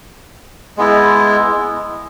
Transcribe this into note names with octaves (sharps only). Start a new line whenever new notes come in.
G#3 B3 E4